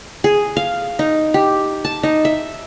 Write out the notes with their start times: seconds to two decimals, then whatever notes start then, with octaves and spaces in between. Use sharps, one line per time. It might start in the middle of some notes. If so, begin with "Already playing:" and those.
0.24 G#4
0.57 F5
0.99 D#4
1.34 G4
1.85 A5
2.03 D#4
2.25 E5